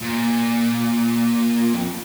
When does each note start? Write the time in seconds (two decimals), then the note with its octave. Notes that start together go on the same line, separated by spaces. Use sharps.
0.01 A#2
1.74 F2